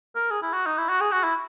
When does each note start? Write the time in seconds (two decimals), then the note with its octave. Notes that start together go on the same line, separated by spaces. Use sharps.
0.15 A#4
0.31 G#4
0.42 E4
0.54 F#4
0.66 D#4
0.78 E4
0.89 F#4
1.01 G#4
1.12 F#4
1.24 E4